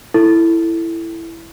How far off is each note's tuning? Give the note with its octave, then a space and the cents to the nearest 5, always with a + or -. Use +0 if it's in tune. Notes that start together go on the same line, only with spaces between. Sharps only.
E4 +10 A4 +10